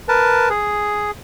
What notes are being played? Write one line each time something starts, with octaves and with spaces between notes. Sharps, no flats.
A#4 B4 A5
G#4